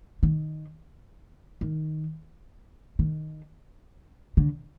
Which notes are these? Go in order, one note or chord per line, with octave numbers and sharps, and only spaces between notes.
D#3
D#3
D#3
D3